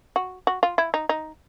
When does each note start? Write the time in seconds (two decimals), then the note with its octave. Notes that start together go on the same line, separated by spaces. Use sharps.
0.16 F#4
0.47 F#4
0.63 F4
0.78 E4
0.94 D#4
1.09 D#4